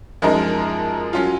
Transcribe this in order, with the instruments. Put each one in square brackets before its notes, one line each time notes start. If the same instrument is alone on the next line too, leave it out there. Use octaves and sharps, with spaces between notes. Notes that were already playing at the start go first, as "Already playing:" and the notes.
[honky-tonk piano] F#2 F3 G#3 D#4 A#4
F#3 C#4 F4